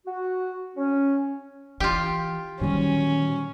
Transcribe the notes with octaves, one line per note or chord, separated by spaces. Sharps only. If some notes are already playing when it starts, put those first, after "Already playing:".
F#4
C#4
E3 F4 G4
A#2 D3 D#3 F#3 G3 C#4